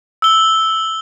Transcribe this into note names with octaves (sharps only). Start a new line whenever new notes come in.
E6 G7